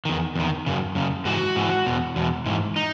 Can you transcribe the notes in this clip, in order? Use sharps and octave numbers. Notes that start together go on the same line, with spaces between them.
E2 D#3
E2 D#3
F#2 C#3
F#2 C#3
G#2 E3 F#4
G#2 E3
E2 B2
E2 B2
G#2 E3
D#4